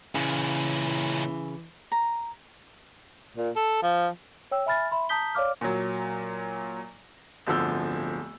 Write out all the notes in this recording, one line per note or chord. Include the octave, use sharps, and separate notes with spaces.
C#2 A#2 C#3 E3
A#5
A#2
A4
F3
C#5 G5 E6
E5 G#5 B5 F6 A6
E5 B5 C6
A5 A#5 D#6 G6 B6 G7
C#5 D5 F5 D6 F6
A#2 F#3
D1 G1 D3 F3 E6 G6